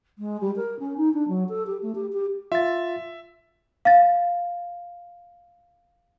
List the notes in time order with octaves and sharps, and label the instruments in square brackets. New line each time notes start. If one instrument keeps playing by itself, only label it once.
[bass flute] G#3
G3
A#4
C#4
D#4
D4
F#3
A4
G4
A3
G4
G4
[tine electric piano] F4 A6 [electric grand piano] E5
[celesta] F5 A6